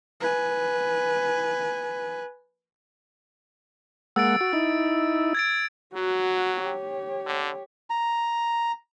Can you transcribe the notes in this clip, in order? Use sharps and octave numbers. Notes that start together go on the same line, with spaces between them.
B4 G#5
G#3 A#3 F#5 E6 A6 D7
F#4
D#4 E4
G#6 A6 D7
F#3 F#4
G4 C#5
D3
A#5